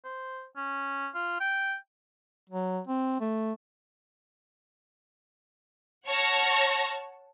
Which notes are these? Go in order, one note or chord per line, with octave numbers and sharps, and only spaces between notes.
C5
C#4
F4
G5
F#3
C4
A3
C#5 F#5 A5 C#6 F6 A#6